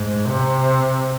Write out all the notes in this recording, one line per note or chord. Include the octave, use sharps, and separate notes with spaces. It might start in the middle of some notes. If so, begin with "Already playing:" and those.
Already playing: G#2
C3